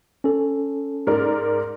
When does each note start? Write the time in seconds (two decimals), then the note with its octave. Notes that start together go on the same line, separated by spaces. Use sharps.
0.24 C#4 A4
1.07 G#2 A#4 D5